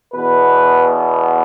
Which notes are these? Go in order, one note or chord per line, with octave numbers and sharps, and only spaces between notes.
E2 B2 B3 B4